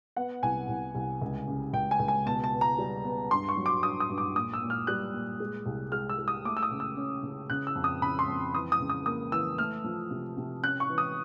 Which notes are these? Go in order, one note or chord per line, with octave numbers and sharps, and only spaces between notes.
B3 F#5
C2 G#5
C2
C2
C#2
C#3
C#2 G5
G#5
C#2
G#5
B2 A5
A5
B3
A#5
G3
B3
G2 C6
C#6
F#3
D6
G2 D#6
D#6
G2
D6
A#2 D#6
E6
A#2
F6
G3 F#6
A#2
G#3
C2
G#3 F6
E6
G#3
D#6
A3 D6
E6
D#6
C#3
E6
C#4
C#3
C#3 F#6
E6
F2
D#6
C#3 B5
C6
F2
E3 D#6
D#6
C#3
D#6
A#3 D#6
E3 E6
A3 F6
F3
C3
C3
C#4 F#6
C#6
E3
D#6